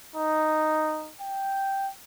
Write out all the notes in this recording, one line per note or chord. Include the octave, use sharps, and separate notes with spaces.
D#4
G5